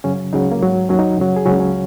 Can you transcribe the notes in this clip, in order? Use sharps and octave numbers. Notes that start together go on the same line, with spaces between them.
F#2 C#3 F#3 C#4
C#2 C#3 F#3 D#4
C#4
A#3
G#2 F#3
D#2 D#3 F#3 C#4
D#4
F#2 C#3 F#3
G#4
C#2 C#3 F#3 C#4
C#4